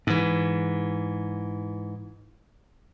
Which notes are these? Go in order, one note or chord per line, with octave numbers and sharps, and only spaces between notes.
G#2 E3